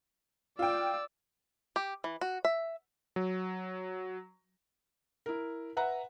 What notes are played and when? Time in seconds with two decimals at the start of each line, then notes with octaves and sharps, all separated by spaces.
0.59 F4 D5 G5 E6
1.76 G4
2.04 E3
2.21 F#4
2.45 E5
3.16 F#3
5.26 E4 A#4
5.77 B4 E5 F#5 A#5